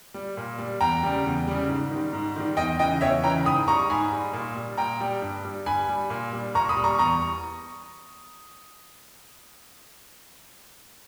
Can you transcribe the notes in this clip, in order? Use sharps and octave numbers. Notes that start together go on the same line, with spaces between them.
G3
A#2
G3
E2 G5 A#5
C#3 G3
E2
C#3 G3
G#2
D#3
G3
G#2
D#3 G3
E2 D#5 G5
C#3 E3 D#5 G5
E2 C#5 E5
C#3 E3 G5 A#5
G#2 B5 D#6
G3 A#5 C#6
G#2 G#5 B5
G3
A#2
G3
A#2 G5 A#5
G3
G2
G3
G2 G#5 B5
G3
A#2
G3
A#2 A#5 C#6
B5 D#6
G3
A#5 C#6
E2 A#5 C#6